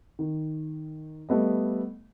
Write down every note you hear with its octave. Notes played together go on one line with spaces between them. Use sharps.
D#3
G3 A3 B3 D#5